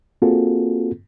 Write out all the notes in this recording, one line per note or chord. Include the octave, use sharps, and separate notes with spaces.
A#3 C4 F4 F#4 G#4 A4